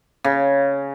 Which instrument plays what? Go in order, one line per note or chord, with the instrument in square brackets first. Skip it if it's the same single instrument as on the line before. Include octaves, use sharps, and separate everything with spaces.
[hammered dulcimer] C#3